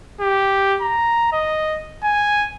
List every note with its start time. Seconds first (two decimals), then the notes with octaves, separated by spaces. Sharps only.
0.21 G4
0.82 A#5
1.33 D#5
2.04 G#5